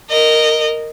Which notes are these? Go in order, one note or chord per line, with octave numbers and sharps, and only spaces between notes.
A#4 D#5